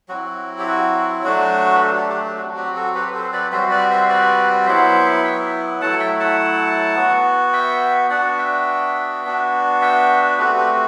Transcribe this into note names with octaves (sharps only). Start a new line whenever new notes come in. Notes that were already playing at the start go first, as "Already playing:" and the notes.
F#3 C4 E4 F#4
G4
F#4
F#3 A3 D4 F#4
B4
F#4 A4
G4
G4
G4
F#3 C4 F#4
G4
F#4 A4
G4 B4
B4
A4 C5
B4 D5
G3 C4 F#4 C5 E5
B4 D5
C5 E5
B4 D5
F#3 B3 E4 C5 E5
E5 G5
F#3 A3 E4 F#5 A5
E5 G5
F#5 A5
B3 F#4
E5 G5
B3 D4 F#4 D5 F#5
E5 G5
B3 D4 F#4
E5 G5
A3 C4 F#4 G4 B4
G4 B4